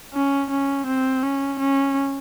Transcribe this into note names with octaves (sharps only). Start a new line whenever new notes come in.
C#4
C#4
C4
C#4
C#4